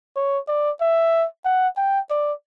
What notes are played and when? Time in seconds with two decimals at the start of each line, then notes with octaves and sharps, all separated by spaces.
0.16 C#5
0.48 D5
0.81 E5
1.45 F#5
1.77 G5
2.10 D5